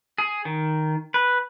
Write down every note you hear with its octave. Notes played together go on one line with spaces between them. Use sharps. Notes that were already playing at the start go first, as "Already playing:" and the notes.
G#4
D#3
B4